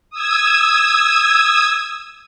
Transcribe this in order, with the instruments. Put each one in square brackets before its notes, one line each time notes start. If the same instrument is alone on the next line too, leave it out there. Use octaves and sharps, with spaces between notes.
[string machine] D#6 E6 G#6